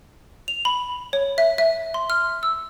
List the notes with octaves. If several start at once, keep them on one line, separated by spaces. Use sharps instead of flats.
F7
B5
C#5
E5
E5
C6
F6
E6